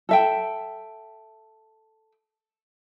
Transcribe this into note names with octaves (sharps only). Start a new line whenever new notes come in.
A4 E5 G5